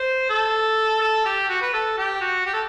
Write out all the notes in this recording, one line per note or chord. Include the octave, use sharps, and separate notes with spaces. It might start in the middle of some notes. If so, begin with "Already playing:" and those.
Already playing: C5
A4
A4
G4
F#4
B4
A4
G4
F#4
G4
A4